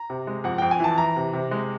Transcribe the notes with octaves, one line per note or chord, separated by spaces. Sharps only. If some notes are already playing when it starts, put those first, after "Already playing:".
Already playing: A#5
C3
G#3
F2 F#5
F2 G5
G#5
E3 A5
E3 A#5
C3
C3
G#3